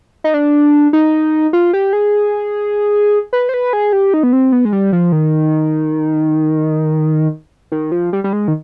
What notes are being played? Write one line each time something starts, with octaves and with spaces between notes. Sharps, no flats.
D#4
D4
D#4
F4
G4
G#4
B4
C5
B4
G#4
G4
D#4
B3
C4
B3
G#3
G3
F3
D#3
D#3
F3
G3
G3
G#3
D#3